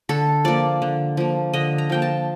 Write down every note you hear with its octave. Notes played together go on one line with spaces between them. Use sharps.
D3 A4
F3 A#3 D5
D3
F3 A#3
D3 D#5
A#5
F3 A#3 G5
A5